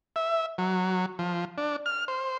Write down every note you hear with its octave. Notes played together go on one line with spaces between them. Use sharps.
E5
F#3
F3
D4
F6
C5